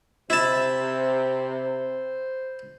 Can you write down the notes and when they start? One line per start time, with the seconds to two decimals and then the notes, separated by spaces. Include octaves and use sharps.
0.30 C3 E4 C5 A5